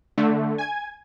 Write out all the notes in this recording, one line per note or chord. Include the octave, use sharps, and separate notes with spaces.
D3 A3
G#5 G#6